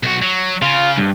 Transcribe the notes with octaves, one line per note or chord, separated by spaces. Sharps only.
B1 F#4
F#3
C#3 F4
G2